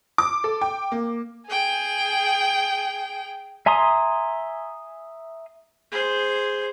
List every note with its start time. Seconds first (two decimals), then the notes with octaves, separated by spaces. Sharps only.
0.18 D6
0.44 A4
0.62 G5
0.92 A#3
1.47 G#4 G5
3.66 E5 G#5 A#5 C6 D#6
5.92 G#4 C5